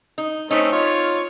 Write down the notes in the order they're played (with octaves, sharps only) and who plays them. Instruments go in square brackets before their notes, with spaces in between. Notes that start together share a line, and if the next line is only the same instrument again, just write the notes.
[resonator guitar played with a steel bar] D#4
[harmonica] A3 C4 C#4 [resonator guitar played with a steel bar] D#4
[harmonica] F4 C#5